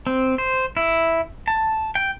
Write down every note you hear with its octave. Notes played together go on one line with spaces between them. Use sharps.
C4
C5
E4
A5
G5